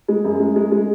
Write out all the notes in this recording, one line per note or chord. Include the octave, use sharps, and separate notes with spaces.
G#3
F#2
G#3
G#3
G#3